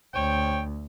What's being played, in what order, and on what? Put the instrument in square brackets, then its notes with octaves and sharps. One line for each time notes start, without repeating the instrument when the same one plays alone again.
[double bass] D2 [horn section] C5 C#5 G5